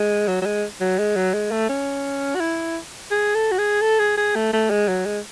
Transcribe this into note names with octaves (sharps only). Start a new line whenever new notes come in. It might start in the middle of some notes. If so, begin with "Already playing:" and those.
Already playing: G#3
F#3
F#3
G#3
F#3
G#3
F#3
G#3
A3
C#4
F#4
E4
G#4
A4
F#4
G#4
A4
G#4
G#4
A3
A3
G#3
F#3
G#3